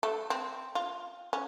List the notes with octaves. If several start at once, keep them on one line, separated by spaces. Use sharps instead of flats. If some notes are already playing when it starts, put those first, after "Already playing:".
A3
C4
F4
C#4